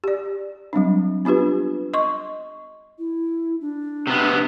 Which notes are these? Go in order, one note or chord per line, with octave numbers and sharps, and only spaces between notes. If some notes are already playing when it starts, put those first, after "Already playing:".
G4 D5
F#3 G3 C4 D4
B3 D4 F4 G4 B4
D#5 C6 C#6
E4
D4
C3 B3